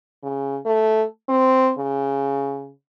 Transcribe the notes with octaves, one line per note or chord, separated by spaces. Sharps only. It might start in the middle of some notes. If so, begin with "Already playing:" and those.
C#3
A3
C4
C#3